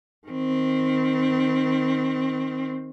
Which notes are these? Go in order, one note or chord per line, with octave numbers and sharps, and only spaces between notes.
D#3 C4